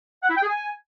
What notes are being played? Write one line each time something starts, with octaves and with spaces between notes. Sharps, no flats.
F#5
E4
G5
G#4
G#5